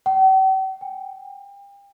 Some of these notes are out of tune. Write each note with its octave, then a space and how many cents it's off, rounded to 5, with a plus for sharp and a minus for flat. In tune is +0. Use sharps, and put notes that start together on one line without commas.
G5 -45
G5 +35